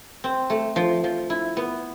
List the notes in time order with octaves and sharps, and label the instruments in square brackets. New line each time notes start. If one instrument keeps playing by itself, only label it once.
[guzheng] C4
A3
F3
F3
E4
B3